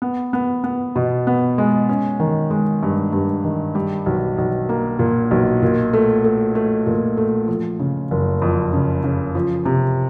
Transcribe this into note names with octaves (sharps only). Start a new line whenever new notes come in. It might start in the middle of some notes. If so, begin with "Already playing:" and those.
B3
B3
B3
B2
B3
G#3
C#4
D#3
G#3
G2
G2
D#3
G3
B1
B1
A#3
A#2
B1
A#2
A3
A3
A3
A#2
A3
F3
C#3
F#1
F2
C#3
C#3
F3
C3